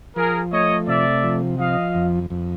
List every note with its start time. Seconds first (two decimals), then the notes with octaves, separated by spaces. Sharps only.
0.16 F3 G#4 A#4
0.52 A3 C#5 D#5
0.87 C3 D5 E5
1.24 F3
1.59 F3 D#5 F5
1.95 F2
2.30 F2